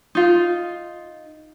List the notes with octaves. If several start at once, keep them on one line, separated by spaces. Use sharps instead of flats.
D#4 F4